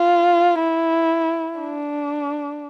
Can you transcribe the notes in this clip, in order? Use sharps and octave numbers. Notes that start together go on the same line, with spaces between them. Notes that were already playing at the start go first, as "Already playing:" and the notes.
Already playing: F4
E4
D4